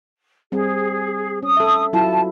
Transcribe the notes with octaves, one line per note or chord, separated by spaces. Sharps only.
G3 C4 G#4
C#4 D#6
A4 E5
F#3 E4 F4 A5